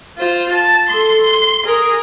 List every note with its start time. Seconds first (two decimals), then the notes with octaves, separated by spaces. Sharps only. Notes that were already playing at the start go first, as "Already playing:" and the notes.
0.18 F4 C5
0.53 A5
0.89 A4 C6
1.21 C6
1.65 G#4 A#4